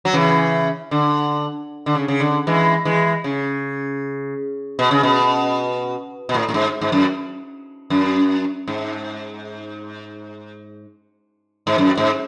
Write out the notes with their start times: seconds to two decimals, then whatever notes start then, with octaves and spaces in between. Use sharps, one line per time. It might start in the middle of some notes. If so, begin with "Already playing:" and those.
0.05 F#3
0.13 C#3 E3
0.91 D3
1.86 D3
1.95 C#3
2.08 C#3
2.20 D3
2.47 E3 G#3
2.85 E3 G#3
3.24 C#3
4.79 B2
4.91 C#3
5.03 B2
6.29 B2
6.34 A2
6.49 A2
6.54 G#2
6.81 G#2
6.92 F#2
7.90 F#2
8.68 G#2
11.67 G#2
11.78 F#2
11.97 G#2